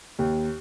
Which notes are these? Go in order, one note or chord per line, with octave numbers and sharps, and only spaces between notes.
D#2